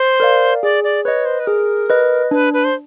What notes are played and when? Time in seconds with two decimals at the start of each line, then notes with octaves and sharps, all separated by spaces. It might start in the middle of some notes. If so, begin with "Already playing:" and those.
Already playing: C5
0.20 A#4 D5 F5
0.63 G#4 D5
0.84 D5
1.04 B4 C#5 D#5
1.25 C5
1.40 B4
1.47 G#4 A#4
1.90 B4 D#5
2.31 D4 B4
2.53 B4
2.64 C5